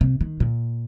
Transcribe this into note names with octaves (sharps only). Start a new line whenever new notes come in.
C3
D#3
A#2